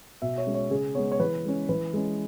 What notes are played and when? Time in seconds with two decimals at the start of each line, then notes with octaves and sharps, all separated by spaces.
0.22 B2 E5
0.38 C#5
0.46 G#3 C#4
0.55 C#5
0.71 C#3 G#4
0.95 G#3 B3 C#5
1.12 C#5
1.19 E3 B4
1.45 G#3 C#4
1.69 E3 B4
1.93 G#3 C#4